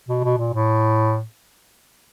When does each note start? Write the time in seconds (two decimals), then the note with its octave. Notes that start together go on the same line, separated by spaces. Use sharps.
0.09 B2
0.24 B2
0.38 A#2
0.54 A2